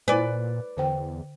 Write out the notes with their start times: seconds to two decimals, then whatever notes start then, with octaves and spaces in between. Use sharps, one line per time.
0.08 A#2 E4 B4 D5 G#5
0.77 E2 D3 C5 G5